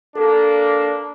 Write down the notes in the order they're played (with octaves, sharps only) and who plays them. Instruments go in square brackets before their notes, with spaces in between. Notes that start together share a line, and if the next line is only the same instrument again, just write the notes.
[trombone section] A#3 D4 [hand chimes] A4